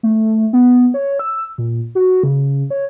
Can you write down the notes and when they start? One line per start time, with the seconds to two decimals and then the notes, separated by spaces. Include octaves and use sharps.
0.03 A3
0.53 B3
0.94 C#5
1.19 E6
1.58 A#2
1.95 F#4
2.23 C#3
2.70 C#5